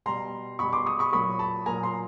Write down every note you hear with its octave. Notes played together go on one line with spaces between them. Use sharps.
B2 G3 A#5 C6
B2 G3 B5 C#6
C6 D6
C#6 D#6
B5 C#6
A#2 F#3 B5 C#6
A5 B5
A#2 F#3 G#5 A#5
A#5 C6